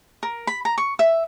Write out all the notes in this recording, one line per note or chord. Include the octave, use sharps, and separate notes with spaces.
A#4
B5
A#5
C#6
E5